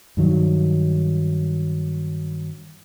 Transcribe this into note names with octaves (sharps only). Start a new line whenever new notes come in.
G2 D#3 F#3